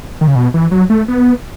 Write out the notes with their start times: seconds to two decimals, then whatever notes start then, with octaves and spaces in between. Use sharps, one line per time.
0.21 D#3
0.27 C#3
0.35 B2
0.54 E3
0.71 F#3
0.90 A3
1.08 B3